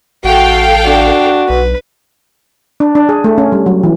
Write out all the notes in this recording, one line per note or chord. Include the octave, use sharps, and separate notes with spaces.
A1 F#4 A4 F5 G5
D4 F#4
B1 B4
D4
D4
G#4
A3
C#4
G3
F#3
E3